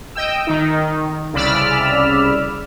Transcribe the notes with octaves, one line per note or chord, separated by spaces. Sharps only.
D#5 G5 E6
D#3 D#4
C2 C#3 D5 B5 E6 F6